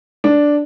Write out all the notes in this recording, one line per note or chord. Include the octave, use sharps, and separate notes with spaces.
D4